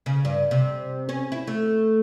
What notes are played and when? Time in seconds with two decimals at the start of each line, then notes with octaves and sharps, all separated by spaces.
0.06 C#3
0.25 G2
0.51 C3
1.09 C#4
1.32 E4
1.47 A3